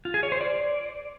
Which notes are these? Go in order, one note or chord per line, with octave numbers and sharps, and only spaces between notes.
F4
G#4
C#5
C5
D5